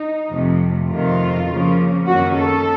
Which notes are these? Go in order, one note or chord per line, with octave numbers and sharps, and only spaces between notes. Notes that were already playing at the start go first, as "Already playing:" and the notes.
Already playing: D#4
F2 C3 F3 A3
F2 C3 D#3 F4
C#3 F3 A#3 C#4
F#2 D#3 A#3 C#4 F#4
A4